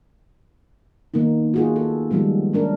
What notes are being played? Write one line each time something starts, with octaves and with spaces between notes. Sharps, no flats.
D#3 A#3 B3 D#4
F4 F#4 G#4
A4
D#3 F3 G3 G#3 B3
C#4 D4 A#4